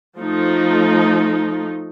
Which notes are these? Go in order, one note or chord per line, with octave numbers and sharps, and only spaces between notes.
F3 A3 D#4